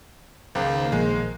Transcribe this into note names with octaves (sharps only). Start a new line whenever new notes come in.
C#2 D#3 A#3 C5
A#1 G#3